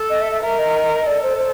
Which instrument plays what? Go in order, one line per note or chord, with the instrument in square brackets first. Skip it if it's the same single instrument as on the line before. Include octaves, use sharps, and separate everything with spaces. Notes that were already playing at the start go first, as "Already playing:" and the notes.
Already playing: [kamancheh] A4
[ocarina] D#5
E5
E5
[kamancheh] A#4 [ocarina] E5
[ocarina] D#5
[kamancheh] A4 [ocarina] D5
[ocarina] C5
C5